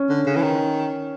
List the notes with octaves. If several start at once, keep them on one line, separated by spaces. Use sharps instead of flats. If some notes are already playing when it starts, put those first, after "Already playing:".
Already playing: C#4
D3
C#3
E3
D#3